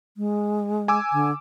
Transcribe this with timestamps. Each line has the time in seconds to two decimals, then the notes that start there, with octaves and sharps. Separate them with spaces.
0.17 G#3
0.88 G#5 D6 E6
1.12 D3